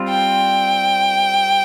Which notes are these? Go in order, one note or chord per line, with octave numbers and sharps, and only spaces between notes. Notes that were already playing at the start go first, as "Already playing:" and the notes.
Already playing: G3 C4 F4
G5